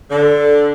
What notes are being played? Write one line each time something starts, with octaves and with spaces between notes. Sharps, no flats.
D3